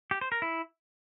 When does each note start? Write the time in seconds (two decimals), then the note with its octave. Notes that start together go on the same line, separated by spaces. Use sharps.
0.11 G4
0.21 C5
0.32 A#4
0.42 E4